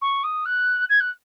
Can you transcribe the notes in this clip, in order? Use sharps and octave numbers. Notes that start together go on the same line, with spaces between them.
C#6
D#6
F#6
G#6
F#6